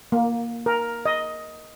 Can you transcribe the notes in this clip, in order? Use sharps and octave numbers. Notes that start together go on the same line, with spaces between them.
A#3
A#4
D#5